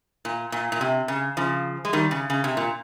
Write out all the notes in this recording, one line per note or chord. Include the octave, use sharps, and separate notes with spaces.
A#2
A#2
A#2
C3
C#3
C#3 F3
G#3
D#3 G3
C#3
C#3
C3
A#2